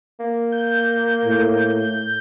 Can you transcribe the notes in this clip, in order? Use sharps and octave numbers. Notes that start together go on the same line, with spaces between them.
A#3
G6
A2